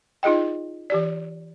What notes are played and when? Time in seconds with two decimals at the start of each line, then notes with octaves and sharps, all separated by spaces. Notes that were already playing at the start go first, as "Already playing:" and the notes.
0.23 D#4 F4 G#4 D#5 G5
0.90 E3 G4 D5